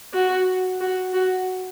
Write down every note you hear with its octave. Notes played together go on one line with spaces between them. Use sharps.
F#4
F#4
F#4